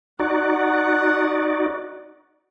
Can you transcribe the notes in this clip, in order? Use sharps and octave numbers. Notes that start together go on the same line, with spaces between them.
D#4 F#4 D5 F#5